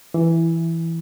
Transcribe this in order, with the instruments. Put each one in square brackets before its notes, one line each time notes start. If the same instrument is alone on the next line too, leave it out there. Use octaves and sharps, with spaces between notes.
[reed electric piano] E3